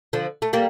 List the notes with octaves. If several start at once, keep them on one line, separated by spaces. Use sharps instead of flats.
D3 F3
A3
G3 A#3